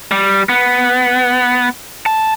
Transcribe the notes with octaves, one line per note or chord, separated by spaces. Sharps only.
G3
B3
A5